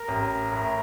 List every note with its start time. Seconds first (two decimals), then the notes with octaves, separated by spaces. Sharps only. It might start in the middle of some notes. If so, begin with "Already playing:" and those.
Already playing: A#4
0.08 A1
0.52 A2